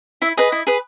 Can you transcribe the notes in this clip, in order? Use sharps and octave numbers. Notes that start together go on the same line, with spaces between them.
E4 E5
G#4 B4 D#5
E4
G#4 B4